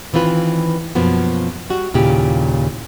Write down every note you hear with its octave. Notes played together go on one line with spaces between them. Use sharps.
D#3 E3 C4 F4 B4
F#2 B2 F3 A#3 B3
G3 F#4
D#2 A#2 C#3 E4 G4